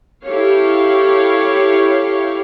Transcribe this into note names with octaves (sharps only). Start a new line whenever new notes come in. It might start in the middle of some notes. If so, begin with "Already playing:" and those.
E4 G4 A4 C#5 F5